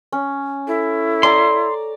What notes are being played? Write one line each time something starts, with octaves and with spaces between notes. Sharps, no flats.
C#4
E4 A4
D5 A#5 C6